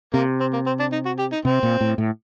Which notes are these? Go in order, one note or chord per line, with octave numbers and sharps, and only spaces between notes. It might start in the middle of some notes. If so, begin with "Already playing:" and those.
C3 A#3
C4
A#3
C4
D4
D#4
F#4
G4
D#4
C3 C4
A#2
A2
A2